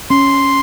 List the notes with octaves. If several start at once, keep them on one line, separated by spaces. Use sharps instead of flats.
C#4 C6